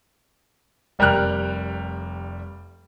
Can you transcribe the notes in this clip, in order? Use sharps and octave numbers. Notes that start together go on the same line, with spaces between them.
F1 G3 A#4 G5 F6 F#6